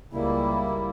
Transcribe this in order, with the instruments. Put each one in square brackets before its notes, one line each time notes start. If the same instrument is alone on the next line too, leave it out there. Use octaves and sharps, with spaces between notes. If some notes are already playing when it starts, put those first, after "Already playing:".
[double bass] C#2 [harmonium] G3 A#3 E4